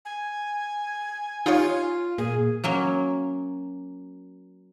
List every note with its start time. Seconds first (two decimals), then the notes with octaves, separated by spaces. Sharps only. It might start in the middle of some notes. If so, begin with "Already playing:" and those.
0.05 G#5
1.46 D#4 F4 G4 C#5
2.18 A#2 G#4
2.64 F#3 A#3 C#4